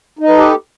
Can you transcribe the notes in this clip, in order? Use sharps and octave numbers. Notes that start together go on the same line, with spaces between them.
D#4 G4 A4 B4 D#5